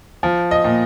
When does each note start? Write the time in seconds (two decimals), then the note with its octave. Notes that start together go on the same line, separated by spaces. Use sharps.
0.23 F3
0.51 D#5
0.64 A#2